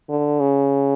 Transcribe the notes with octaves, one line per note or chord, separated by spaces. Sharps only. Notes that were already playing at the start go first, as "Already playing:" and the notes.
D3
C#3